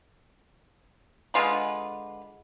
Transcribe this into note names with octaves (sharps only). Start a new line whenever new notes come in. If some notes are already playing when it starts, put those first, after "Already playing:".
D3 G#3 F4 B4